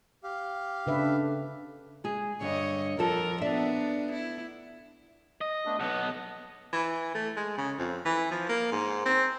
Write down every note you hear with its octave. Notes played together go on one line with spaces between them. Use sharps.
G4 F5
C#3 D4 A4 B4 E5
G#3 G#4
G2 D3 C#5 D#5
F2 F3 A4 A#4
B3 D4 A4 D5 E5
E4
D#5
A3 B3 D4
B1 B3 D#5 F#5 A5
E3
A3
G#3
C#3
F2
E3
F3
A#3
G#2
C4